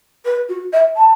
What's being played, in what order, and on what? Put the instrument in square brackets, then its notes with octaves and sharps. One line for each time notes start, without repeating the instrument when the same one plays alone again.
[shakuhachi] B4
F#4
E5
A5